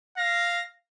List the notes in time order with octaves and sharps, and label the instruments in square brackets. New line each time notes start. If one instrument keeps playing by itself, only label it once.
[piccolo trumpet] F5 [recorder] A#6